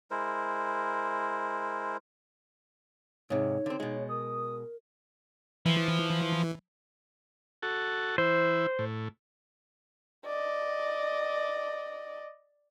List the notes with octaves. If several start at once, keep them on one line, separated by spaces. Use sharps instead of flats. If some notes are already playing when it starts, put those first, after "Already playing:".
G#3 E4 A#4 C5
G#2 C3 D#4 C#5
D3 C4
B2 G#3
A#4 D#6
E3 F3
F#4 A4
E3 E4 C5
A2
D5 D#5